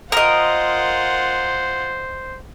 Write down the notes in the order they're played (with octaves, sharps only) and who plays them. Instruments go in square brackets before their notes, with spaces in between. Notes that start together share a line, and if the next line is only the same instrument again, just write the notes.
[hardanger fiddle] F4 F#5 [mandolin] A#4 D#5 [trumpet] C5